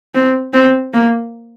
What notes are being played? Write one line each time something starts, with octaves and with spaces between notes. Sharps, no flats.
C4
C4
A#3